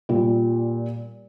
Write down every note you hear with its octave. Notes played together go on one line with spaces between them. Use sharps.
A#2 G3